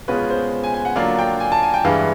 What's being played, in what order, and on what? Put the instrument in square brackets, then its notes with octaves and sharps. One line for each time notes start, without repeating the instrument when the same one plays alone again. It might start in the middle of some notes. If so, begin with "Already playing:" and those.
[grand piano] B2 G#3 C#4 F4 B4
C5
G#5
G#5
F#5
D3 F#3 A#3 D4 F4 F5
G5
G#5
A5
G#5
G5
G2 E3 G#3 F5